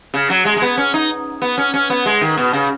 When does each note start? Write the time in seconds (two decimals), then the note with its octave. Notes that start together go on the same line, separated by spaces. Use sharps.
0.14 C#3
0.30 F#3
0.45 G#3
0.57 G#3
0.62 B3
0.77 C#4
0.94 D#4
1.42 B3
1.58 C#4
1.74 C#4
1.90 B3
2.06 G#3
2.21 D#3
2.38 B2
2.53 C#3